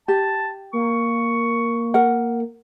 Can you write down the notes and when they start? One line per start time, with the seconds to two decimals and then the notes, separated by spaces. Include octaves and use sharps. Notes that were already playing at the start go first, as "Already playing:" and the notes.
0.08 G4 A5
0.73 A#3 C#6
1.94 A#4 F#5